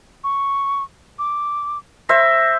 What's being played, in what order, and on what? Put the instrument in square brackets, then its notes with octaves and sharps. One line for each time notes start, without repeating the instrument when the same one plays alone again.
[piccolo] C#6
D6
[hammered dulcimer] C5 E5 [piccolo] A#6